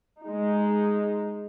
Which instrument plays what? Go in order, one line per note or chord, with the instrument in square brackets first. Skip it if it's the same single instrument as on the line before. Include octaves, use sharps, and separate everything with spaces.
[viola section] G#3 D#4